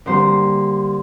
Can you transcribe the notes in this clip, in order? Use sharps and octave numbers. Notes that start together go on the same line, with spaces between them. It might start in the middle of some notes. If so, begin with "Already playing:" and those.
D3 G3 A#3 C5